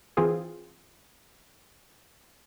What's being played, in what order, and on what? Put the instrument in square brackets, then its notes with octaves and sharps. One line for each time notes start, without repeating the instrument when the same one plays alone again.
[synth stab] E3 C4 F4 G#4